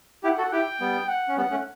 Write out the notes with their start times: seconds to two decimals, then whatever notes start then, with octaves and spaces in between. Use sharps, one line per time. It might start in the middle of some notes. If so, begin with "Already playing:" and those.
0.23 E4 G4 F#5
0.38 F#4 A4
0.52 E4 G4 G5
0.80 G3 B3
1.09 F#5
1.28 C#4
1.37 G3 B3 F#5
1.51 A3 C#4